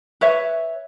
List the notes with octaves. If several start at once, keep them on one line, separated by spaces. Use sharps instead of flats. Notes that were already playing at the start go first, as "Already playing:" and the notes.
B4 C#5 E5